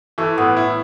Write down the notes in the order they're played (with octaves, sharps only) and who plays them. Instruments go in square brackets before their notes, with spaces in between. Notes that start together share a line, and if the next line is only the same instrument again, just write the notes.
[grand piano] E3 [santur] A3
[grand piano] A2 [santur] B3
[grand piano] E4